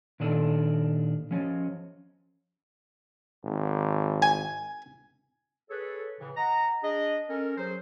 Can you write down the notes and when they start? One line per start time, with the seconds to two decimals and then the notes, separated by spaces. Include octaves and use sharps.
0.20 A#2 D#3 D4 A4
1.31 F3 C#4
3.44 G#1
4.22 G#5
5.70 G#4 A4 B4 C#5
6.20 A2 C#3 E3
6.37 D#5 F#5 A#5
6.84 D4 G#4 D#5
7.30 C#4 A4 A#4
7.58 F#3 G#4 C5